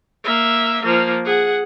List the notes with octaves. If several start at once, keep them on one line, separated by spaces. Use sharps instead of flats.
A#3 E5
F3 A#3
G#4 F#5